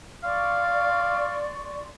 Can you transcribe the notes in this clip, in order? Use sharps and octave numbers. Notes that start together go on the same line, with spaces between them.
D5 F5 C6 C#6